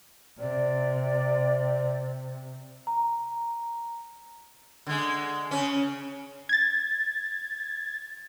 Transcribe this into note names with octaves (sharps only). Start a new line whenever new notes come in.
C3 D5
A#5
D3 G#3
C#3 C#4
G#6 A6